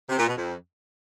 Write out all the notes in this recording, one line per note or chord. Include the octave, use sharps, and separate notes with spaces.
C3
A#2
B2
F2